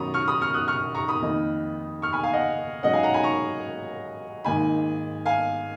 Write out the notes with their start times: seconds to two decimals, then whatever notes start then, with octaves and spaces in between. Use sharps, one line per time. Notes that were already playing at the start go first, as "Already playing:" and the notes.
Already playing: F#2 D#3 F#3 A#5 B5 C#6 D#6
0.14 C#6 F6
0.28 B5 D#6
0.41 C#6 F6
0.54 D#6 F#6
0.68 C#6 F6
0.95 A#5 C#6
1.08 B5 D#6
1.21 F2 D#3 A#3 D#4
2.02 C#6 F6
2.13 G#5 B5
2.23 F5 G#5
2.33 D#5 F#5
2.83 G#2 F#3 C#4 D#5 F#5
2.93 F5 G#5
3.03 F#5 A#5
3.14 G#5 B5
3.23 A#5 C#6
4.45 G#1 G#2 D#3 A#3 G#5 B5
5.26 F5 G#5